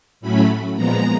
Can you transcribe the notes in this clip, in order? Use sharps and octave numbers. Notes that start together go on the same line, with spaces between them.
A2 F#3 A3 C#4 B5
A#2 F3 G#3 B3 A#5